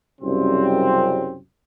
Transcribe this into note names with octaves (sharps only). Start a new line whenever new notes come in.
C2 F#2 C#3 G3 C4